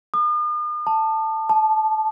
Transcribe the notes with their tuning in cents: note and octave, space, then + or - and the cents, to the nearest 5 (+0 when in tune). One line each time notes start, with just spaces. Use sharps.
D#6 -45
A5 +10
A5 -20